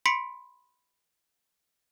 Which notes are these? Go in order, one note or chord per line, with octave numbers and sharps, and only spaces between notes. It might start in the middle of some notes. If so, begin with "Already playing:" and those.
B5 C6 B6 C#7 D7